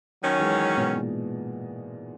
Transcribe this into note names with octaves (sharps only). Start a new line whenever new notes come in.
D#3 F#3 C#4
E3 G#3
G#2 B2
A#2